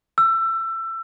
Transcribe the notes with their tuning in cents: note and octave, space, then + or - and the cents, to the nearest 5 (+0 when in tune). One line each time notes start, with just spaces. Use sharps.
E6 +25